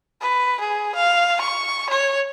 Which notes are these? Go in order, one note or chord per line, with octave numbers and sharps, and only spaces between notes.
B4
G#4
F5
C#6
C#5